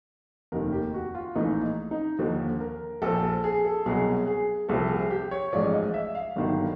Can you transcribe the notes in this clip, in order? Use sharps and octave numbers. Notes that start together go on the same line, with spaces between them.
F1 D#2 D#3 A#4
G4
F#4
F4
A#1 A2 E3 D#4
D#4
D#2 D3 F3
A#4
A#1 A#2 F3 A4
A4
G#4
A4
C2 B2 F#3 G#4
G#4
C2 C3 F3 A4
G#4
G4
C#5
A1 G#2 F3 D5
D#5
E5
F5
G1 G2 D#3 F#3